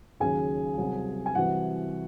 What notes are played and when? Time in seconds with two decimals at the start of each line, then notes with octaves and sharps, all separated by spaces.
0.20 D#2 C#3 F#3 G#4 G#5
0.77 C2 C3 F#3
1.26 G#5
1.35 C2 C3 E3 F#4 F#5